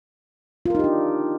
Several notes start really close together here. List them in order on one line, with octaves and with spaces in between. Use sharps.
F4 A#4 D#4 G4 D4